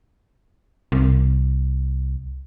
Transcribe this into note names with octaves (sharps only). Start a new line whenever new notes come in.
C2